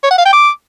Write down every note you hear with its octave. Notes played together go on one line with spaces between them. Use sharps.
C#5
F#5
F5
G5
D6